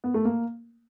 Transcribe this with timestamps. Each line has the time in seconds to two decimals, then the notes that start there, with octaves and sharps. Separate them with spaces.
0.04 B3
0.14 A3
0.25 A#3